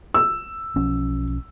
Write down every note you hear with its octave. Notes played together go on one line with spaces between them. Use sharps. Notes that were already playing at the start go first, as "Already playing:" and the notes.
E6
B1 F3 C#4